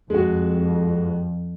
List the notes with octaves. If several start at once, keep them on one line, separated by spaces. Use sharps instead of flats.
F2 G#3 F#4